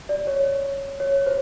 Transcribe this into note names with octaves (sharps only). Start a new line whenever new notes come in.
D5
C#5
C#5
C5